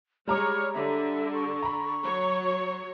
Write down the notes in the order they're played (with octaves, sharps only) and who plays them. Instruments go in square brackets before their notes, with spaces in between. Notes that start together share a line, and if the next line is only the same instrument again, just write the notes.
[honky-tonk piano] G3 A#5 D6 [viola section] G#3 C#5 [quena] F6
[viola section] D3 [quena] E5
[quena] C#6
[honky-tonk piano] A#5 B5
[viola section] F#3 C#5